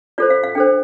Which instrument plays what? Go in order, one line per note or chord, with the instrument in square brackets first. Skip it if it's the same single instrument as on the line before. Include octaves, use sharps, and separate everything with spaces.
[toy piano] F4 A4 C5 D5
F5
F5
D4 A4 C5 G5